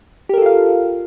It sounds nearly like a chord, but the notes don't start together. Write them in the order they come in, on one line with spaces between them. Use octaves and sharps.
G4 A#4 A4 F4 F5